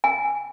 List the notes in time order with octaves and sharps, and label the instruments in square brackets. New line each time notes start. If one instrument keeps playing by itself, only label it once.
[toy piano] G#5